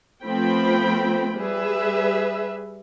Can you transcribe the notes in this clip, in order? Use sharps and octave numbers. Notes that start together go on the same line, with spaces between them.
F3 A3 B3 C4 G5 B5
G3 G#4 B4 E5